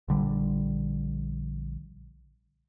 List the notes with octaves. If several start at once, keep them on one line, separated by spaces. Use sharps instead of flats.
A#1 D3 G3